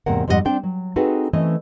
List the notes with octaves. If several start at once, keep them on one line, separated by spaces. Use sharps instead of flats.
E2 G#2 C3 A#3 A#4 F#5
F2 G#2 G3 C#4 D#5 F#5
C4 D4 D5 G5
F#3
C4 D#4 F#4 G#4 A4 B4
E3 A3 C4 C#4 D#5